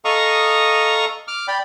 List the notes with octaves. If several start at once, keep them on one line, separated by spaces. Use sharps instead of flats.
A4 D#5 F5 A#5 C#6 D#6
D6 F6
D5 G5 B5